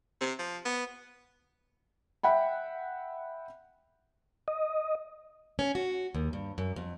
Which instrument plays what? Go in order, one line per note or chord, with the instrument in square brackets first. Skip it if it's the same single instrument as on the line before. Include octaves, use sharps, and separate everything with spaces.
[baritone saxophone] C3
F3
B3
[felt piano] E5 F#5 G5 B5
[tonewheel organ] D#5
[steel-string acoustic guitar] C#4
F#4
D#2
G2
F#2
F2